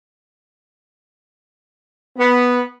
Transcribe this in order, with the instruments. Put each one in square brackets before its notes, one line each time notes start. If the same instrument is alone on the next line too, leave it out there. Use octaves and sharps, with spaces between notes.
[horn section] B3